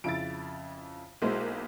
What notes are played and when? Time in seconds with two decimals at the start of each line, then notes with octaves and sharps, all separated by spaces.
0.04 F2 C#3 E4 A6 D7
1.22 B1 G#3 A#3 E4 F#4 C5